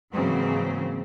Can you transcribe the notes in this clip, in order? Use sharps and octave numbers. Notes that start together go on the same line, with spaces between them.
G#2 C#3 E3 F#3 A#3 C4